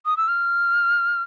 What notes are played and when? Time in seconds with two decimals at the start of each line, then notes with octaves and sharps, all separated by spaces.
0.06 D#6
0.17 E6
0.28 F6